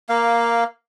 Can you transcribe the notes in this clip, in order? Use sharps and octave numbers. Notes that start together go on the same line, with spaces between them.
A#3 F5